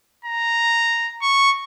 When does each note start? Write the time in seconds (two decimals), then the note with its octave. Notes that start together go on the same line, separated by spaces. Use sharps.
0.25 A#5
1.22 C#6